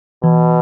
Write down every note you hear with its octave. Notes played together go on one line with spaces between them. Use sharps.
B2 E3